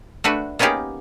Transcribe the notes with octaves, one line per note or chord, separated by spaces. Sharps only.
A3 D4 F#4 B4
A#3 B3 C#4 D#4 G4 G#4